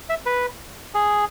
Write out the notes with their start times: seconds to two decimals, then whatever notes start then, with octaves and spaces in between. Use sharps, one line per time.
0.10 E5
0.26 B4
0.94 G#4